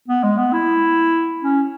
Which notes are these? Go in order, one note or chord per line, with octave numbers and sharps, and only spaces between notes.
B3
G#3
B3
E4
C#4